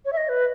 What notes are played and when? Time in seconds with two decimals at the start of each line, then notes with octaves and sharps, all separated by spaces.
0.05 C#5
0.13 E5
0.17 D#5
0.29 B4